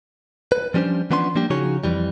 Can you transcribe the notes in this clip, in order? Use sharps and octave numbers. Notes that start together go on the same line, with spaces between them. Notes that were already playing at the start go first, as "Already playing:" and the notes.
B4
F3 G3 C#4 D4 C5
E3 F3 B3 C#4 D4 C6
F3 G3 A#3 D4 G4
C#3 F3 D#4 F#4 G#4 C#5
F2 E3 G3